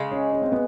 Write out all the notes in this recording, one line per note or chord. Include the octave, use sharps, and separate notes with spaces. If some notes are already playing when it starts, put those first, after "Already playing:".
Already playing: C#3 G#3
C#4
C#4
C4
B3